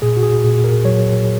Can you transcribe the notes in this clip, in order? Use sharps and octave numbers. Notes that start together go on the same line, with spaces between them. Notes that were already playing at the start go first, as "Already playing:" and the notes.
A#2 G#4
F#4
G#4
A#2 G#4
A#4
F#3 C#5